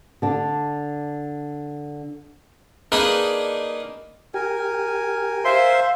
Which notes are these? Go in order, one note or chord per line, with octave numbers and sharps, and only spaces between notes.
D3 D4
A#3 D4 D#4 G#4 A#4 B4
G4 A#4 G#5
C5 E5 F5 C6